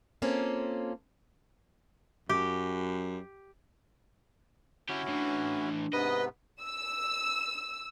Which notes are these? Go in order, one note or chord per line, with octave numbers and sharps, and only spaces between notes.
A#3 C4 C#4 F4 A4
F#2 G4
D3 C#4 E4 F#4 G4
A2 E3 D4
G#2 C3 B3 B4 D#5
E6